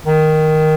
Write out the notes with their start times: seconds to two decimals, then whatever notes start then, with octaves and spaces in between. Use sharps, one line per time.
0.06 D#3